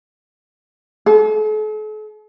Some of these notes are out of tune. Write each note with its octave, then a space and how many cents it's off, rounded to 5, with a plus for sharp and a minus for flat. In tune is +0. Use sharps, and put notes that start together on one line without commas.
A4 -45